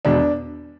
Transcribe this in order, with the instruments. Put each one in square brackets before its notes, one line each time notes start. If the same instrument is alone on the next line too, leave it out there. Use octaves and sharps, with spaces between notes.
[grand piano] E1 D4